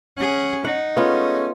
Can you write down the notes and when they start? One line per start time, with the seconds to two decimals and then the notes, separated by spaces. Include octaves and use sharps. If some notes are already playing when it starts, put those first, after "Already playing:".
0.18 C#4 G#4 F#5
0.65 D#4 F#5
0.97 G#3 A3 B3 C#4 F4